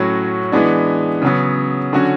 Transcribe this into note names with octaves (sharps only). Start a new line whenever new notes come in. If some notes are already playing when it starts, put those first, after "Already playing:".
Already playing: A2 F#3 C#4 F#4
E3 G#3 B3 D4
C#3 F#3 B3
D3 F#3 C#4 F#4